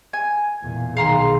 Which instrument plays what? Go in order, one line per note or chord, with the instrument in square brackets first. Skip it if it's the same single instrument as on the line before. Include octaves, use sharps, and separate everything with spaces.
[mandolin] G#5
[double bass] E2 A#2
[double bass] B1 D#3 [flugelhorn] G#4 [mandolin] F5 A#5 C6